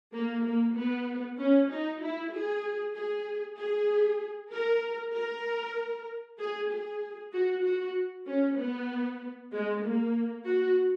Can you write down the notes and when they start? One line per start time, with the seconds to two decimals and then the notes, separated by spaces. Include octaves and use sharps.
0.13 A#3
0.44 A#3
0.75 B3
1.37 C#4
1.70 D#4
2.01 E4
2.32 G#4
2.94 G#4
3.58 G#4
4.52 A#4
5.13 A#4
6.39 G#4
6.70 G#4
7.33 F#4
7.64 F#4
8.26 C#4
8.58 B3
9.51 G#3
9.83 A#3
10.46 F#4